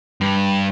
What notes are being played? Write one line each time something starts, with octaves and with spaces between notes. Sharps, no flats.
G2